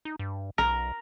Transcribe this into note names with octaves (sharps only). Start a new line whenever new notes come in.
D#4
G2
B1 A#4